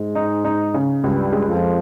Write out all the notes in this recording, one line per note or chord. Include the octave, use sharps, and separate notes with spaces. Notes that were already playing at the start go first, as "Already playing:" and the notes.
Already playing: G#2 G#3
D#4
D#4
C#3
C#2 G2 G3
G#3
F2 F3